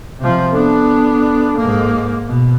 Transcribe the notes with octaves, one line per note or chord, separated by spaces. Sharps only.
C3 F3
B3 D4 A4
G#2 A#3
B2